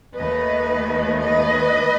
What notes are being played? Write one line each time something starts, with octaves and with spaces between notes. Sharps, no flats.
D#2 D#3 A3 B4 D#5
B4 D#5